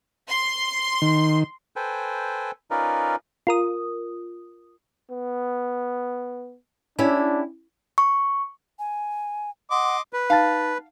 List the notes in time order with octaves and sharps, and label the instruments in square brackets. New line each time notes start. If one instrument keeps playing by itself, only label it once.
[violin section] C6
[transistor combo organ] D#3
[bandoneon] A4 B4 C5 G5 G#5
C#4 D#4 F4 A#4 B4 D5
[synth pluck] F4 A#4 D#6
[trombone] B3
[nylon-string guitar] C#4 E4 G4 [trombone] D4
[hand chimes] C#6
[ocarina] G#5
[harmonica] D#5 C6 D6 [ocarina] F#5
[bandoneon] B4
[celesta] D#4 A5 A6 [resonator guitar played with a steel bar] F5